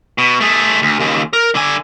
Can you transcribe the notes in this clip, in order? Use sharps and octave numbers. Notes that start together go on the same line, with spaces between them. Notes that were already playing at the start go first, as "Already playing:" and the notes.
B2
A3 G#4
D2
D#2 C#3
A#4
D3 G#5